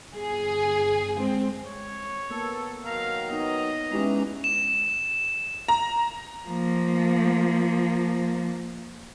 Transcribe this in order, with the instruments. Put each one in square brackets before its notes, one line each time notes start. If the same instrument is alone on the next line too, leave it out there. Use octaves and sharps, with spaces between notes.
[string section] G1 G#4
G#3 C4
[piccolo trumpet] C#5
[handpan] A#3 B3 [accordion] A4
[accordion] D#3 F#3 A#5 [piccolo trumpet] F5
[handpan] B3 D#4 [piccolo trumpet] D#5
[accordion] E2 E3 A#5 [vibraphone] G#3 C#4 [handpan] B3 E4 G4
[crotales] E7
[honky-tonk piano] A#5
[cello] F3 A#3